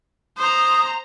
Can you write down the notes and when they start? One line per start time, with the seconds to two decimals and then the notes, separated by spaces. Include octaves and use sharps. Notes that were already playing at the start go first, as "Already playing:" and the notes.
0.38 C5 A#5 D#6